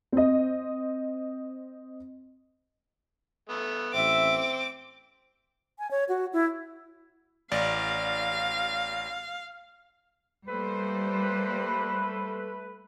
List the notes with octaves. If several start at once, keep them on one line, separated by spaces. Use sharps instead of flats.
C4 D#5
A3 B3
A1 C4 E5 D6
G#5
C#5
F#4
E4
A1 D5 F5
G3 A3 A#3 B4 C5